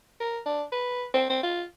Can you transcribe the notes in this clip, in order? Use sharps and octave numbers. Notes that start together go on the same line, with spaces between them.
A#4
D4
B4
C4
C4
F4